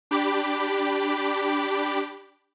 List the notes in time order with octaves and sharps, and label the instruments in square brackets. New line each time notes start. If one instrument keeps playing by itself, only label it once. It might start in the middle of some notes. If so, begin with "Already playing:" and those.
[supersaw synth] D4 G4 B5 D6